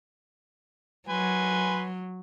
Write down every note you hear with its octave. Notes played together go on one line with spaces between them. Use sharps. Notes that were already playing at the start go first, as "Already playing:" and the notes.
F#3 B4 G#5 C6